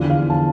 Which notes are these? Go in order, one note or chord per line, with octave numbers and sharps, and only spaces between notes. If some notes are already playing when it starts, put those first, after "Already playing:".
Already playing: E2 D3 F3 D5
F5
A5